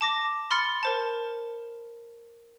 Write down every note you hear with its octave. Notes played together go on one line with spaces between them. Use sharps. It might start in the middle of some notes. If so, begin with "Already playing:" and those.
A5 D6 A#6
B5 C6 F6 A6 C#7
A#4 C5 A5